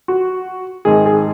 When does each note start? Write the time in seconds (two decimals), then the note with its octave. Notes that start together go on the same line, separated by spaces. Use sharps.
0.08 F#4
0.85 G#1 G#2 D#3 G#4
1.06 G#4